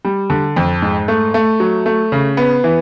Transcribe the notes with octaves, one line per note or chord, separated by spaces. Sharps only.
G3
D3
F2
G#2
A3
A3
F#3
A3
C#3
B3
E3